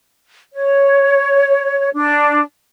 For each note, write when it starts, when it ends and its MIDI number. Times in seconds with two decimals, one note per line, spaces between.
0.54 1.89 73
1.94 2.42 62